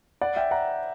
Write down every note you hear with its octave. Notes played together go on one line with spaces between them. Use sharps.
D5 F#5
E5 G5
F#5 A#5